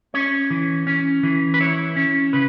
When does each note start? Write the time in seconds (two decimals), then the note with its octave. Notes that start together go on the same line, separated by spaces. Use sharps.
0.14 C#4 C#5
0.50 E3
0.87 C#4
1.23 E3
1.54 B4
1.61 E4 C#5
1.97 C#4
2.33 C#3 B4